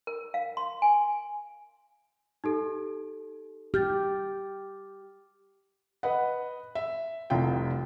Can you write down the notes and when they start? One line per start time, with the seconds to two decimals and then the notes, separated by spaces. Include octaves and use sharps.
0.07 A#4
0.34 F5
0.57 C6
0.82 G#5
2.44 D#4 G4 A4
3.74 G4 F6 G6 A6
6.03 B4 D#5 F#5
6.75 E5
7.30 F1 C2 F4 G5